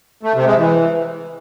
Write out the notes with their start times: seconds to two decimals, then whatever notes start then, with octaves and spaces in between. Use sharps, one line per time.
0.23 A3
0.35 C3
0.46 G#3
0.58 E3